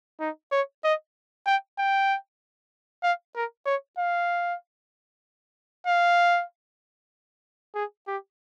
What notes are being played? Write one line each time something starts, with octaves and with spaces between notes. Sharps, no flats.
D#4
C#5
D#5
G5
G5
F5
A#4
C#5
F5
F5
G#4
G4